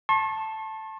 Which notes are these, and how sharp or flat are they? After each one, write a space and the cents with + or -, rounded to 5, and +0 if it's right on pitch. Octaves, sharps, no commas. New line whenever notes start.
A5 +0 C#6 -45